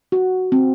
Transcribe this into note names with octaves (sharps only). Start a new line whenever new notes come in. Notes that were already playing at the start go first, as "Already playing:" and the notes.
F#4
C4